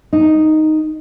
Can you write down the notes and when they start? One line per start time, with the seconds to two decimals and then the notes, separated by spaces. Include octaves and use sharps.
0.13 D#4